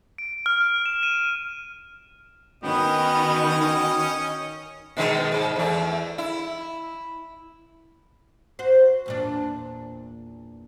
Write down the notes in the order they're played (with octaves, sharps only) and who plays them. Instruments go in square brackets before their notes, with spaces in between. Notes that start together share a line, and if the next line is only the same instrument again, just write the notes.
[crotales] D7
F6
E7
D#7
[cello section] D#3 [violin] B3 [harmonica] C#4 D#5 [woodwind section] F#4 G5
[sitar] B2 D#3 G#3
G#2
E2 A3
E4
[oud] F#4 C5
E2 A#2 D4